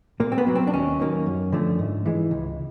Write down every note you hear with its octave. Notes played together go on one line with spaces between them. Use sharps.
A#2 A#3
C4
B3
F#3 A#3
C4
D4
D#2 C#4
D#3 F#3 A#3
F#2
D3 F3 A3
G#2
E3 G#3
C#2